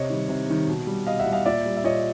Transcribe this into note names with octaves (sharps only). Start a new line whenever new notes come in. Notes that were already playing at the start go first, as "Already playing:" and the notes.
Already playing: C3 C#5 D#5
D#3 G3
C3
D#3 G3
B2
G3
B2 D#5 F5
E5 F#5
G3
D#5 F5
A#2 D5 E5
G3
E5
A#2 C#5 D#5